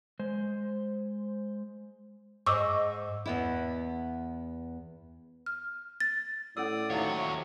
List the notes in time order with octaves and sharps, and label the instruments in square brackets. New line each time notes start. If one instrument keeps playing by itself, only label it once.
[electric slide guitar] G#3 C5
[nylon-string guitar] G#2 C5 D#5 [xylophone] C#6 D6 E6
[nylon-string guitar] E2 B3 E4
[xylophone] F6
A6
[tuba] A2 [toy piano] C#4 A4 E6 [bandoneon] D5 D#6
[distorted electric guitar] D#2 C#5 [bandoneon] C3 F#3 C#6 [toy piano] D#4 E5 F5